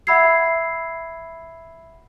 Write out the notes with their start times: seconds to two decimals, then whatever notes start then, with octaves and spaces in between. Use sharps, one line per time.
0.07 E5 F#5 B5 E6 G#6 C7